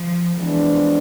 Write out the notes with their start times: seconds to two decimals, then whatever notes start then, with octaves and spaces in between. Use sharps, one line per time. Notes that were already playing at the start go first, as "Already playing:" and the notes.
Already playing: F3
0.35 E3 F3 G#3 B3 D4